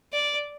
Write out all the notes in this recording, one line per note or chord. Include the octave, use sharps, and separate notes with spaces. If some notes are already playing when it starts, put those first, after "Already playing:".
D5